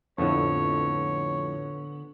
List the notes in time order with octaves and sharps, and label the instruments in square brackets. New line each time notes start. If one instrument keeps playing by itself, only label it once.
[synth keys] F2 A2 [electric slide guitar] D3 B3 [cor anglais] C#5